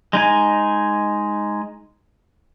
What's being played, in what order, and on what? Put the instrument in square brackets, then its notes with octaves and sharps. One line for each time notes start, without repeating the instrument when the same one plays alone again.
[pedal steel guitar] G#3 D#4 G#5